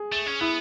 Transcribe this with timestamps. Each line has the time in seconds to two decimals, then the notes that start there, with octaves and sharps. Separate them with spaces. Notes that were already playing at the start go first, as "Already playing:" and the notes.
Already playing: G#4
0.12 A3
0.27 C#4
0.41 B3 E4